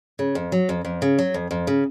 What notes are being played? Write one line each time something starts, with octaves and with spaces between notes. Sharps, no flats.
C#3
F2
F#3
F2
F2
C#3
F#3
F2
F2
C#3